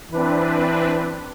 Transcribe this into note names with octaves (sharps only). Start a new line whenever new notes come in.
E3 C4 D4 B4